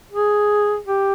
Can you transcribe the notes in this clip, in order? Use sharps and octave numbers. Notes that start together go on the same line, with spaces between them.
G#4
G4